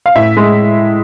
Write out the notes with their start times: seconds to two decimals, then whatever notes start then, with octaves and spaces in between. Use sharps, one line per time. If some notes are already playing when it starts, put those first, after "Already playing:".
0.06 F5
0.16 A2 E5
0.37 G#3